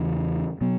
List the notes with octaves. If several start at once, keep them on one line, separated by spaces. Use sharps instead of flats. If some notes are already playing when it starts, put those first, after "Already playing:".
Already playing: E2 C#3 E3
B2 F#3 B3